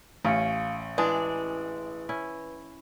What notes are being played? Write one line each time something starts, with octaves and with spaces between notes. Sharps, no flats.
A1 C#4 F5 C#7
E3 G#3 D4 B4
C#4 E4